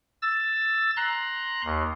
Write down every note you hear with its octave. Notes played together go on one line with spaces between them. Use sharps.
E6 A6
A#5 C6 F#6
D#2